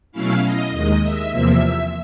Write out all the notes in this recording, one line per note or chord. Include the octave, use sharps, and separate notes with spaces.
B2 F#3 A3 C#4 E4 F5
D#5
D#2 D#3 G#3 D#5
E5
E2 C3 F3 A#3